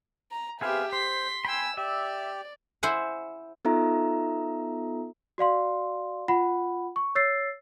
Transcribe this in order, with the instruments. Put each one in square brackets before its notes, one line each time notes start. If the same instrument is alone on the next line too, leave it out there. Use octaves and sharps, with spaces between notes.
[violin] A#5
[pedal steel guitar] B3 G#4 F5 [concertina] C4 B4 [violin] G4 E5
[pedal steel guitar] C5 [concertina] C6 [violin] B6
[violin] G5 E6 [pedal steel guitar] G#5 B5
[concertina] G4 [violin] D5 [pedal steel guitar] E5
[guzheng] E4 C5 F#5 G#5
[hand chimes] B3 D#4 F4 A4 E5 A#5
[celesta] F#4 D5 F5 C6
F4 F#5 B5
C#6
C#5 E6 A6 C7